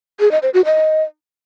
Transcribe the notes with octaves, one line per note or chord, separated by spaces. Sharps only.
G#4
D#5
C5
F#4
D#5